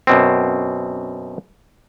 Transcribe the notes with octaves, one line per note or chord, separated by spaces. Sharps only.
F#2 B2 C4